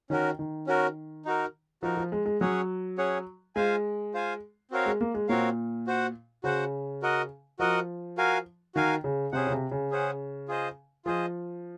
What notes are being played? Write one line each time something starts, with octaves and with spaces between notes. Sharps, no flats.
D#3 C#4 F#4 A#4
D#3
C#4 F#4 A#4
D#4 F#4 A#4
F3 D#4 F#4 A#4
F3
G#3
G#3
F#3 C#4 G#4 C#5 F#5
C#4 G#4 C#5 F#5
G#3 F4 C5 F5 G#5
F4 C5 F5 G#5
C4 F#4 A#4 C#5 F5
G#3
A#3
G#3
A#2 C4 F#4 A#4 C#5 F5
F#4 C5 F#5
C#3 F#4 C5 F#5
F#4 A#4 D#5 F#5
F3 F#4 A#4 D#5 F#5
F#4 A#4 F5 G#5
D#3 F#4 A#4 F5 G#5
C#3
C3 C#4 G#4 C5 F#5
C#3
C3
C#3
C#4 G#4 C5 F#5
F4 G#4 C5 D#5
F3 F4 G#4 C5 D#5